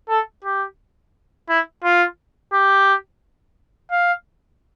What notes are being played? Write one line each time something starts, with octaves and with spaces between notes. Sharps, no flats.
A4
G4
E4
F4
G4
F5